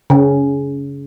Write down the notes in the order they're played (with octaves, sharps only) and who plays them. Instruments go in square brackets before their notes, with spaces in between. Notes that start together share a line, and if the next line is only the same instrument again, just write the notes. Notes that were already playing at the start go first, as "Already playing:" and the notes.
[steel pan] C#3